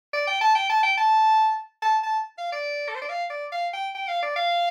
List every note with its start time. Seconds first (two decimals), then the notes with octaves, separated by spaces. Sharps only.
0.13 D5
0.27 G5
0.41 A5
0.55 G5
0.70 A5
0.83 G5
0.98 A5
1.82 A5
2.03 A5
2.38 F5
2.52 D5
2.89 A4
2.95 C5
3.02 D5
3.09 F5
3.30 D5
3.52 F5
3.73 G5
3.95 G5
4.08 F5
4.23 D5
4.36 F5